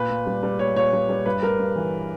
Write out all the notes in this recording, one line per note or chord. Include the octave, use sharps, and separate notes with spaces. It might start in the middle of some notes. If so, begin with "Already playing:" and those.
Already playing: A#2 B4
A#2
G3
G3
A#2 C#5
A#2 C#5
G3
G3
G2 B4
G3 A#4
G2
E3